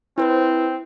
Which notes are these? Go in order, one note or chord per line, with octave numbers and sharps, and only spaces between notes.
C4 E4 B4 C5